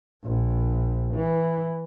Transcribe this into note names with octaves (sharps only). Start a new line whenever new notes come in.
A#1
E3